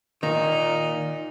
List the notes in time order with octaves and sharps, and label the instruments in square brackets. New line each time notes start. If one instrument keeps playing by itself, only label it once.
[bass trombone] A#2 [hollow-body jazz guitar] D#3 [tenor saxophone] D#4